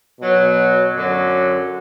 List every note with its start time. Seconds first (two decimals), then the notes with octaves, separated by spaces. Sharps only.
0.20 B2 F#3
0.94 F#2 D3 F#3